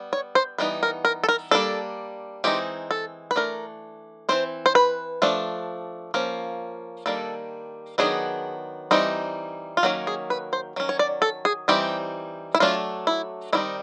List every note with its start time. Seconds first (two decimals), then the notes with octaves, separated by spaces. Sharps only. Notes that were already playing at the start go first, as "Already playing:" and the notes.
Already playing: G3 B3
0.13 C#5
0.35 C5
0.58 E3 G3 B3 D#4 B4
0.83 A#4
1.05 A#4
1.24 A4
1.29 A#4
1.51 G3 A#3 D4 A4
2.44 E3 G#3 C4 D#4 G4
2.91 A4
3.31 B4
3.36 E3 A3 D4 A#4
4.29 E3 G#3 C4 C5
4.66 C5
4.75 B4
5.22 F3 A3 D4
6.14 F3 A#3 C#4
7.06 D#3 G3 A#3 D4 A4
7.98 D#3 F#3 B3 D4 G#4
8.91 E3 G3 C4 D#4
9.77 F4
9.83 D#3 F#3 A#3 C#4 F#4
10.07 G#4
10.30 B4
10.53 C5
10.76 D#3 F#3 C#4
10.89 C#5
10.99 D5
11.22 A4
11.45 G#4
11.68 E3 G3 C4 D#4 G4
12.55 E4
12.60 F#3 A3 D4 F4
13.07 E4
13.53 D#3 G3 C4 D#4 E4